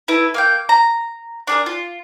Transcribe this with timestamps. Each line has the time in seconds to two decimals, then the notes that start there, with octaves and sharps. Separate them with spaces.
0.08 E4 A4 B4
0.34 A#3 F5 G5
0.69 A#5
1.47 D4 G#4 A#4
1.66 F4